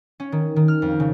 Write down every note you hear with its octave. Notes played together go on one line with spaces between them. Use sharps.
C#4
D#3
D#3
F6
F2
C#3